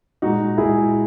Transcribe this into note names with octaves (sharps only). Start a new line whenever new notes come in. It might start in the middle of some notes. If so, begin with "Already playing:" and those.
A#2 G#3 D#4 F#4
A#2 G#3 E4 G#4